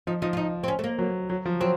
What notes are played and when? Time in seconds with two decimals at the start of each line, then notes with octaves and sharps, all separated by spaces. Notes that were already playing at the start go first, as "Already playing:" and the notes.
0.07 F3 D#4
0.22 F3 D#4
0.33 F4
0.37 D#4
0.63 C4
0.68 C#4
0.79 A3
0.84 A#3
0.99 F#3
1.30 F#3
1.46 F3
1.60 F#3 C4